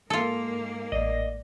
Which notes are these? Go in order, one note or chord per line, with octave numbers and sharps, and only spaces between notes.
G#2 A#3 F4 A4
A1 D5 D#5 A#6